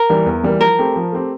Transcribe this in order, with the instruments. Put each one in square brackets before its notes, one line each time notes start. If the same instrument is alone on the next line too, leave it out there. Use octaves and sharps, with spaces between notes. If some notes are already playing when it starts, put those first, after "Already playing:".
Already playing: [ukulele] A#4
[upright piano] E3 G3 A#3
E2
E3 G3 A#3
[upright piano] F3 [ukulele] A#4
[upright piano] A3 C4 G4
F3
A3 C4 G4